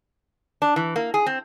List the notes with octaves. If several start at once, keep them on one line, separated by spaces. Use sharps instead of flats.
D4
E3
A#3
G#4
C4